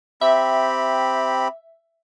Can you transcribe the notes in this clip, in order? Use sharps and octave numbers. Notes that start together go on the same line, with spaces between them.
C4 G4 E5 B5